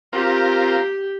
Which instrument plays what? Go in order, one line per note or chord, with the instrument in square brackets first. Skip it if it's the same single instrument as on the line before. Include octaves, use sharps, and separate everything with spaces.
[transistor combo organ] C4 F4 A#4 [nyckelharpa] G4